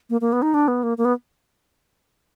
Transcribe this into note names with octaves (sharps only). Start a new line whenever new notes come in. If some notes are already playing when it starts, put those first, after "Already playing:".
A#3
A#3
B3
D#4
D4
B3
A#3
A#3
B3